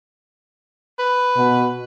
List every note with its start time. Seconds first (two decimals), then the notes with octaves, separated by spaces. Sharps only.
0.99 B4
1.36 B2